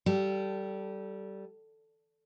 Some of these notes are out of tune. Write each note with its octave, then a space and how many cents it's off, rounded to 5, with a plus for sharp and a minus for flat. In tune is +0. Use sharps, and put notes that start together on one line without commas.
G3 -15 A4 +0 F5 +0